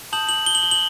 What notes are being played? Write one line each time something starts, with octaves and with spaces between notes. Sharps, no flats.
A5 D#6 G6 F#7
F#7
G7
F#7
G7
F#7